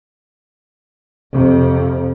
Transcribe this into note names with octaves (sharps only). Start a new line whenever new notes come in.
F2 C3